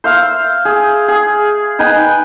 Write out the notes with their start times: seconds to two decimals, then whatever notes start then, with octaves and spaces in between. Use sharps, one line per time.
0.04 C5 E5 F5
0.65 G#4
1.08 G#4
1.79 D#4 B4 G5 G#5